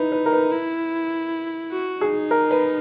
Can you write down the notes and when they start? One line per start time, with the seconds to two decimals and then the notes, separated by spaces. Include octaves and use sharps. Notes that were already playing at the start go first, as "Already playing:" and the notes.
Already playing: D#4 E4 B4
0.12 B4
0.26 A#4
0.33 B4
0.52 E4
1.71 F#4
2.01 D#4 G#4
2.31 A#4
2.51 B4